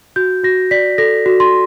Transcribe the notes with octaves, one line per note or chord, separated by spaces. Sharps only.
F#4 G6
F#4 A#6
D5 B6
A4 A#6
F#4
C6